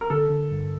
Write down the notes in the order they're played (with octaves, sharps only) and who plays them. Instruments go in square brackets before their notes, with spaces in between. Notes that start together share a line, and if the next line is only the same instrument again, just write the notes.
[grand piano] A#4
[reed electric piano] D3 [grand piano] A4
[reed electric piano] D3
G2